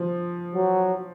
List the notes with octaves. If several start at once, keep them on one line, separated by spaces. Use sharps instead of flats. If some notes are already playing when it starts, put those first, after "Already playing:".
Already playing: F3
F#3